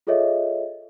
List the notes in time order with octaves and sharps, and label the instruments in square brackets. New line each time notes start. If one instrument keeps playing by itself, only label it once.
[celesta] F4 G#4 A4 C#5 D#5 E5